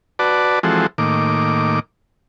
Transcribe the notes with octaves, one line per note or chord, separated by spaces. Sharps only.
F#4 B4 D5 A5
E3 F3 G#3 C4 F#4 A4
A2 D#3 A#3 D6